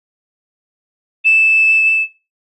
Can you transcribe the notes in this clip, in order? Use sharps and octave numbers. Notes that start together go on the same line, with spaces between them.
E7